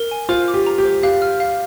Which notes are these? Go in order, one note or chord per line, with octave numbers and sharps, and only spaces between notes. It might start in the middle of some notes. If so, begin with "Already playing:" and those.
Already playing: A#4
G#5
F4 C5
D6
G4
A#5
G4
C5
G4 F5
F6
F5